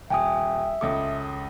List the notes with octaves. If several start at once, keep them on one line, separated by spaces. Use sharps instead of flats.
D#1 E5 G5 G#5 D#6
C#2 C#3 A4 D6 D#6